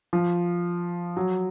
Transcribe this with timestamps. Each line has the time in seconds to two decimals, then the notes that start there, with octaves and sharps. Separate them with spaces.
0.13 F3
1.17 F#3